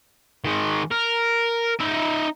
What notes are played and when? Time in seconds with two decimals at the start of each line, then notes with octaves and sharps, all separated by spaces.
0.45 D#3 G#3
0.91 A#4
1.80 D#4 E5